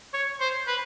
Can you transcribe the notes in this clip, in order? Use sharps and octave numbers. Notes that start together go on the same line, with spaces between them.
C#5
C5
B4